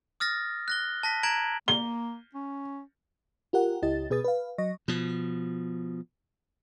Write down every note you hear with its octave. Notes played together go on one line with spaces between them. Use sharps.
D#6 F6 A6 A#6
F#6 A#6 G7
A5 A#6 B6
A#5 G#6 D7 F#7
A#3 G7
C#4
F4 G4 A#4 F#5
C#2 E4 G4 D#5 A6
B2 G#4 B4 D#6 A6
B4 F5
F#3 D#5 C#6 A#6
B2 F3